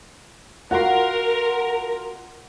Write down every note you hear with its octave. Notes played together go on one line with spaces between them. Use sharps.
F4 F#4 A#4 F#5 C6